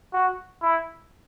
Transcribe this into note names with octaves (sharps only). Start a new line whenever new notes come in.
F#4
E4